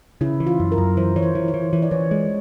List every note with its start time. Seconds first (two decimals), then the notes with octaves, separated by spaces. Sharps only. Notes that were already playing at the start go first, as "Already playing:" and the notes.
0.21 C#3 E4
0.40 E3
0.47 F4
0.60 F#2
0.72 A#4
0.78 F#2
0.97 E3 C5
1.16 E3 C#5
1.22 C5
1.35 E3
1.48 C#5
1.54 E3
1.73 E3 C#5
1.82 D5
1.91 E3 C#5
2.11 G#3